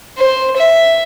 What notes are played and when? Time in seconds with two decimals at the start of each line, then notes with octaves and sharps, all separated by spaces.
0.17 C5
0.56 E5